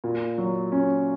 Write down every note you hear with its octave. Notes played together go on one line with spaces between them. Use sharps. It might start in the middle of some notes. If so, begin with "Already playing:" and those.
A#2
F#3
C#4